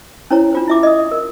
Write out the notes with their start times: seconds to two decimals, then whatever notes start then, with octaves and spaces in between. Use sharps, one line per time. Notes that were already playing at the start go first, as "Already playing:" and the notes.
0.31 C#4 E4 C5 C#5 A#5
0.53 D4 F4 C5
0.68 E4 E5 D6
0.83 D#5 D#6
1.12 A#4